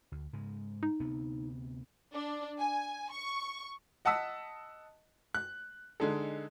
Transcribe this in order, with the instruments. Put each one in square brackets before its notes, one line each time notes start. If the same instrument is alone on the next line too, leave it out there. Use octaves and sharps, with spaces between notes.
[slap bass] D2
G#2 C#3 G#3
[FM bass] D#4
[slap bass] D2 C3 B3
[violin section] D4
G#5
C#6
[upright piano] D#5 F#5 A5 D#6 E6 B6
F#6
D3 G#3 D#4 A4